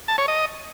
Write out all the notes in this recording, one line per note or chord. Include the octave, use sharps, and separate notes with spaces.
A5
C#5
D#5